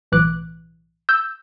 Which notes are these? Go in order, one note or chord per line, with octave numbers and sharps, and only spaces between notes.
B1 A2 E3 D6 F#6
E6 G6